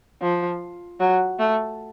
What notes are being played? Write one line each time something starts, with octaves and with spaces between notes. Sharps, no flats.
F3
F#3
A3